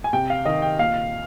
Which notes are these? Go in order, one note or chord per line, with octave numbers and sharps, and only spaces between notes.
G#5
C3 G5
F5
D#3 D#5
G5
A#2 F5